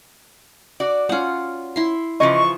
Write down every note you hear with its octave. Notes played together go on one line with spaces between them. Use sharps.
F#4 D5
C#4 D#4 F4 F#5
E4 C6
C#3 E3 F3 D#5 C#6